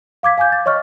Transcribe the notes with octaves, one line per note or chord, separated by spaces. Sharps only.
F5 D6 G#6 B6
F5 G#5 D6 G6
A6
C#5 D#5 C#6 F6